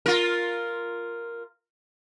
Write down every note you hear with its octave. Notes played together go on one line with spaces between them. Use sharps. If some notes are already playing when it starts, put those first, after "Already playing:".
F4 A#4